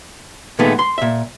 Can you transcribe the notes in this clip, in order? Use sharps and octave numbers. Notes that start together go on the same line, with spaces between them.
A#2 D#3 G#3 A3 B3
C6
A#2 E5